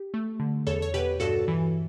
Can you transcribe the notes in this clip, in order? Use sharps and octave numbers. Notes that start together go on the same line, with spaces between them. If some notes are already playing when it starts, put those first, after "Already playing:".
Already playing: G4
A3
D3
E2 A4 C#5
C#5
B2 G4 B4
G2 F#4 A4
E3